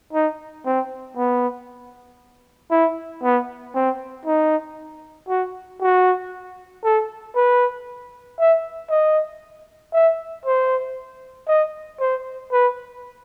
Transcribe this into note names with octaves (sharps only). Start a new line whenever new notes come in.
D#4
C4
B3
E4
B3
C4
D#4
F#4
F#4
A4
B4
E5
D#5
E5
C5
D#5
C5
B4